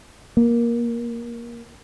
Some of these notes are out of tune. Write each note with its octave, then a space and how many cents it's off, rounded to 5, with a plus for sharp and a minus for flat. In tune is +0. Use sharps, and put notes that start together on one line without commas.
A#3 +15